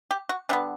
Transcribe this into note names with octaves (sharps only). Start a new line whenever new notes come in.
G4
F#4
D3 G3 B3 D4